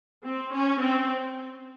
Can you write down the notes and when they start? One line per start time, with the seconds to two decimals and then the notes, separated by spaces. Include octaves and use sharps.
0.24 C4
0.53 C#4
0.81 C4